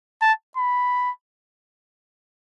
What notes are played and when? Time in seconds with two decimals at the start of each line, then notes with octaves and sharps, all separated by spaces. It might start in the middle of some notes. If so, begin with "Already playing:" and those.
0.22 A5
0.57 B5